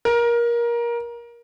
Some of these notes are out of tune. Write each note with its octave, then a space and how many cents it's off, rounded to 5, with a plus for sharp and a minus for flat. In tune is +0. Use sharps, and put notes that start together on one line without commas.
A#4 +20